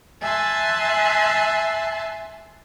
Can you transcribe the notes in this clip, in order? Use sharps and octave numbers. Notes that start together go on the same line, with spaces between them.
E5 G#5 A5 C6 F#6